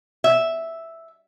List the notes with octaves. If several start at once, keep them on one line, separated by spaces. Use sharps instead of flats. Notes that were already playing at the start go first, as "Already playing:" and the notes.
E5